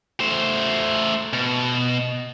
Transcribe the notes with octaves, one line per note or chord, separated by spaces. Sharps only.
A3 C5
B2